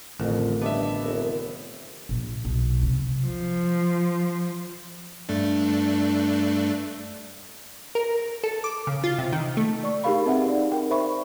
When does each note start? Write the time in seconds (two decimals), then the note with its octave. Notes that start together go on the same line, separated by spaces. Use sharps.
0.20 A1 F2 D3 D#3 A#4
0.61 G2 B3 D#5 E5 A5 D6
1.05 F1 A#4
2.09 A#1
2.45 B1
2.83 C3
3.25 F3
5.29 G2 A3 D4
7.95 A#4
8.44 A4
8.64 D6
8.87 C#3
9.04 F4
9.18 C3
9.33 D#3
9.57 A3
9.83 D5 C#6
10.04 D#4 G4 G#4 A#4 F5 B5
10.26 C4 B4 E5 F#5
10.46 D#4 D5
10.72 A#4 G5
10.90 C5 E5 B5 C#6